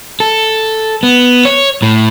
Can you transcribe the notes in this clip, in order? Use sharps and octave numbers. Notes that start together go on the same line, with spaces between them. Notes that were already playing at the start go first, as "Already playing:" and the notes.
A4
B3
C#5
A2